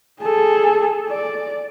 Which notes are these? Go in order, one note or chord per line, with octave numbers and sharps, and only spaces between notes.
G#4 A4
D5